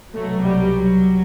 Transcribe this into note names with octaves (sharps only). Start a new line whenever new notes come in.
C2 B2 F#3 A3
G3
F#3